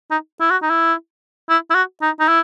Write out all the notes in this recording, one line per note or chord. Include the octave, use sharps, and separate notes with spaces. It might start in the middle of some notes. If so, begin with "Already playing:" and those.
D#4
E4
F#4
D#4
E4
E4
E4
F#4
D#4
D#4
E4